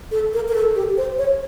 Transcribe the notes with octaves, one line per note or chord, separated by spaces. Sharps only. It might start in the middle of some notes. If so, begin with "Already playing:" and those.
A4
A#4
A#4
A4
G4
C5
C#5